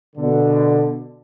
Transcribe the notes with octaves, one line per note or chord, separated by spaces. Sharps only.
B2 D3